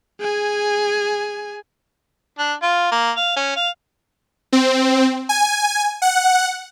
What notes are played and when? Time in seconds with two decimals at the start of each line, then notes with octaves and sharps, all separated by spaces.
0.21 G#4 G#5
2.39 D4
2.62 F4
2.92 A#3
3.16 F5
3.37 C#4
3.57 F5
4.52 C4
5.29 G#5
6.02 F#5